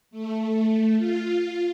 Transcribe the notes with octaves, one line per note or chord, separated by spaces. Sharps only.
A3
F4